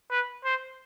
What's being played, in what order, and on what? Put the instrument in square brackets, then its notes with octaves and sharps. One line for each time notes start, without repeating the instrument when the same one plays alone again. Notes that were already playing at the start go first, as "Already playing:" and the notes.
[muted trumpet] B4
C5